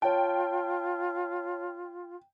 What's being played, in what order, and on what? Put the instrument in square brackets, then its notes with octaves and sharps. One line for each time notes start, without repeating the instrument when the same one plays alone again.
[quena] F4 [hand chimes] C#5 A5 [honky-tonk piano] G5